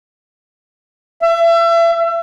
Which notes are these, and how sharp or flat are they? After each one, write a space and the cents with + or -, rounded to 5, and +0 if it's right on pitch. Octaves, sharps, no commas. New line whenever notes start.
E5 +35